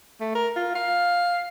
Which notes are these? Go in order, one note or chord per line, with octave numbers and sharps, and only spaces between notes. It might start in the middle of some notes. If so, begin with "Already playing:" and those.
A3
A#4
F4
F5